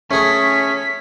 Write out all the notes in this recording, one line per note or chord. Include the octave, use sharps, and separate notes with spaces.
A3 C#4 G#4 A4 B6